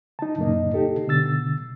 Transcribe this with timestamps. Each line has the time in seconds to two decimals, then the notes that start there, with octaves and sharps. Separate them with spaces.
0.19 D#4 A5
0.38 F#2 A#2 C#3 A#3 D#4 D#5
0.74 D#4 G4 A4
1.07 B2 D3 E6 A6